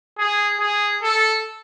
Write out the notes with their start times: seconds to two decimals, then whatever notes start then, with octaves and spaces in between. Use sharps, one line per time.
0.19 G#4
0.60 G#4
1.03 A4